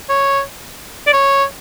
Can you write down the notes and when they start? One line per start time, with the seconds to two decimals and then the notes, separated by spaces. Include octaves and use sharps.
0.09 C#5
1.07 D5
1.13 C#5